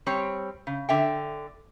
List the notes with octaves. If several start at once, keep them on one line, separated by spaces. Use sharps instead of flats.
G3 C4 C#5
C#3
D3 E5 G5